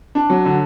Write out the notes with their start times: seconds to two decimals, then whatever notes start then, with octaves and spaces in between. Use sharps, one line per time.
0.15 D4
0.30 F#3
0.45 D3